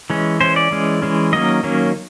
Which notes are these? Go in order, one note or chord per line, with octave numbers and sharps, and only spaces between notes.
E3 G#3 C#4
E3 G#3 C#4 C5
D5
E3 G#3 C#4
E3 G#3 C#4
D#3 F#3 A#3 C#4 D#5
D#3 F#3 A#3 C#4